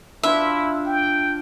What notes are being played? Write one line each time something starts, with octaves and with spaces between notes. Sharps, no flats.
D4 E4 F4 E5
G5